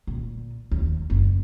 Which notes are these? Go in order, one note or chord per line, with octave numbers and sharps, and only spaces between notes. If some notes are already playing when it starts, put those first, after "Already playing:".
A#2
D#2
F#1